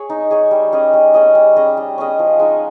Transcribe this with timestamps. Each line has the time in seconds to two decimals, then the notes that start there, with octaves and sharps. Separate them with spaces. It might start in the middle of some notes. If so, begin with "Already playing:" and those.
Already playing: G#4 C#5
0.10 D#4
0.31 G#4 C#5
0.51 G3
0.72 C#4 G#4 D#5
0.94 G3
1.14 C#4 G#4 D#5
1.35 G3
1.56 C#4 G#4 D#5
1.77 G3
1.98 C#4 G#4 D#5
2.19 F3
2.39 G#3 D#4